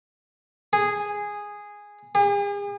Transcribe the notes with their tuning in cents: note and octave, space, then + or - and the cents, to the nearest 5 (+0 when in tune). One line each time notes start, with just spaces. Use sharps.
G#4 -10
G#4 -45